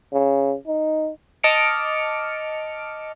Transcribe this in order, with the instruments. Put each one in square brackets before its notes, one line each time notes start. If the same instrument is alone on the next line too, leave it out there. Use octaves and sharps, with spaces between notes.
[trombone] C#3
D#4
[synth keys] D#5 A5 D6 F6 C#7 D7